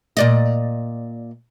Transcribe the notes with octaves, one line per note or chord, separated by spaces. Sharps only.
A#2 D5 D#5